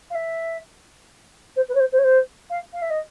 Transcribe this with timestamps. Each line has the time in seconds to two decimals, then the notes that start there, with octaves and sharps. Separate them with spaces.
0.10 F5
0.15 E5
1.56 C5
1.68 B4
1.74 C#5
1.80 C5
1.92 C5
1.98 C#5
2.04 C5
2.50 F5
2.73 F5
2.82 E5
2.90 D#5